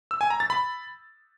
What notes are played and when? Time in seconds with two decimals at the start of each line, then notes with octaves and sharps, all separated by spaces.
0.11 E6
0.21 G#5
0.30 A#5
0.40 A6
0.50 B5